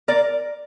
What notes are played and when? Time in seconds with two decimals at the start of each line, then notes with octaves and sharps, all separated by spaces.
0.08 A#4 D5